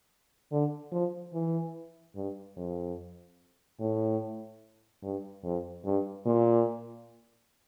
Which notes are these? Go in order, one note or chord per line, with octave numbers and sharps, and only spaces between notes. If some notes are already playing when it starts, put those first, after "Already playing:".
D3
F3
E3
G2
F2
A2
G2
F2
G2
A#2